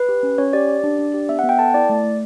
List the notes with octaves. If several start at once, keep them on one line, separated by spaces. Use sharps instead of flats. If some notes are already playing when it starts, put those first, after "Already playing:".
Already playing: B4
G4
C#4
C#4 C#5
G4 D5
G4
D4
D4
G4
B3 E5
F#5
B3
G5
A4 A5
E4 D5
A3
A3